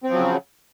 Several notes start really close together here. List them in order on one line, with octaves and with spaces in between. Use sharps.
C4 F3 F#3 C#3